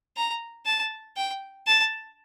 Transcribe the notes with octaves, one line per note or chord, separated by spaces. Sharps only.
A#5
A5
G5
A5